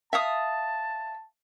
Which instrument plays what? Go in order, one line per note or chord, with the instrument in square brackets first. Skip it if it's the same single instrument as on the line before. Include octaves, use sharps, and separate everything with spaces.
[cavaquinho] E5 F5 D#6 [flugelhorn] A5